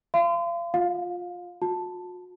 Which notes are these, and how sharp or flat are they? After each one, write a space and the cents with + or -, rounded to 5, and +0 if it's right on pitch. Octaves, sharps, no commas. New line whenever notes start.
F5 -35 C6 -35
F4 +15 F5 +25
F#4 -45 A5 +0